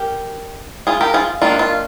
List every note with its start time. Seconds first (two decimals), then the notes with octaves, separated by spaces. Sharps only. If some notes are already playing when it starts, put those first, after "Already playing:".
Already playing: G4 A#4
0.87 F4 G#4
1.01 G4 A#4
1.14 F4 G#4
1.42 D#3 A#3 D4 F4
1.59 F4